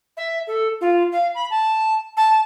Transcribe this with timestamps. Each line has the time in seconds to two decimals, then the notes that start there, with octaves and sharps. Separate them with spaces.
0.17 E5
0.47 A4
0.81 F4
1.12 F5
1.35 B5
1.51 A5
2.17 A5